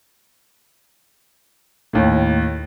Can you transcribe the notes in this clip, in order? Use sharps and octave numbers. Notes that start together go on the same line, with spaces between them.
D#2 A2